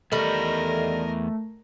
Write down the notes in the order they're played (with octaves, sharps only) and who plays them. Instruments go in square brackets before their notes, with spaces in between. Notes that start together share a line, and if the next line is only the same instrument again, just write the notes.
[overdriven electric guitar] E2 B5 [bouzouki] D#3 G3 [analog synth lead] A3 [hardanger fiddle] A#4 D#5